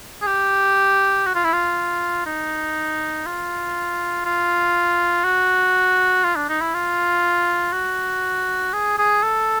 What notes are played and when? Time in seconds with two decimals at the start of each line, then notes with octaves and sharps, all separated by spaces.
0.22 G#4
0.27 G4
1.26 F#4
1.35 F4
1.44 E4
1.53 F4
2.26 D#4
3.26 F4
4.26 F4
5.24 F#4
6.24 F4
6.36 D4
6.49 D#4
6.61 E4
6.74 F4
7.73 F#4
8.73 G#4
8.98 G#4
9.23 A4